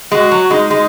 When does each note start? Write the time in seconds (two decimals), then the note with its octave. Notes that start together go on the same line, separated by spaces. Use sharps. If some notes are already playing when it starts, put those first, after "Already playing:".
0.12 G#3 F#4
0.31 F#3
0.51 G#3 D#4
0.70 G#3